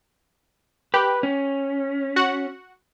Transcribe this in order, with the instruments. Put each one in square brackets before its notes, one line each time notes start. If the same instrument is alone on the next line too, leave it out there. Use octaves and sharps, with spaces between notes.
[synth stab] G4 [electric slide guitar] B4
[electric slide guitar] C#4
[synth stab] F#4 F#5